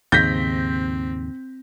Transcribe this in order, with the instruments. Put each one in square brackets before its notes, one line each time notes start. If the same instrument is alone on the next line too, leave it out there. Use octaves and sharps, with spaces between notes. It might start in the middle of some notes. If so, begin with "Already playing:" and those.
[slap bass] D#2 G#2 C#3 [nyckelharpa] C4 [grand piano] G6 A#6 B6